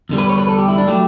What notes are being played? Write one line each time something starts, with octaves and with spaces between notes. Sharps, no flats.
E2 D3 G3
B4
C#5
B4
A4
G4
E4
D4
F#3 A3 G4